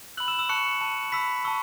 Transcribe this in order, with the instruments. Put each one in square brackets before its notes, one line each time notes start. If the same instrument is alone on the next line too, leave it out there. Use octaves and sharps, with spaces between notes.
[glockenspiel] B5 E6 F#6 F#7
E6 E7
E6 E7
A5 C#6 F#6 C#7
A5 E6
B5 E6 B6
A5 C#6 E6